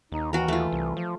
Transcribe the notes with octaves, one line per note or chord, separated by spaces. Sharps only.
D#2 D#4
E3 F#4 A#4
D#2 A3 F4
C2
F3